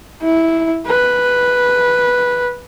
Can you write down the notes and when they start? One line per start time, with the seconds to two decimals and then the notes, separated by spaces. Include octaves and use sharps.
0.22 E4
0.87 B4